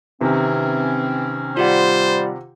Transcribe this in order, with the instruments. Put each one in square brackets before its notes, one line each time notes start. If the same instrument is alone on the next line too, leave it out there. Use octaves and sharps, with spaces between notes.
[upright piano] C3 D#3 [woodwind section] E3 C4 C#4
[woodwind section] G3 [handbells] F4 G4 F#5 [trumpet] C5